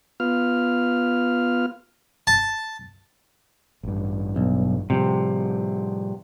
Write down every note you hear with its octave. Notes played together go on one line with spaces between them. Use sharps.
B3 F4 F6
A5
A1 G2
B1
A2 C3 F3 G3